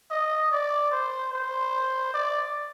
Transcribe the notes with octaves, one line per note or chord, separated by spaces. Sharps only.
D#5
D5
C5
C5
D5